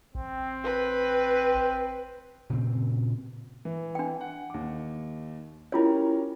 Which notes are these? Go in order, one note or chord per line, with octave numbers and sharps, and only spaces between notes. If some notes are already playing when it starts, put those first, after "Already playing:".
A1 C4
B4
A#2 C#3 C4
E3
D4 G5
F#5
D#2 D6
C#4 E4 F4 G4 A#4 C#5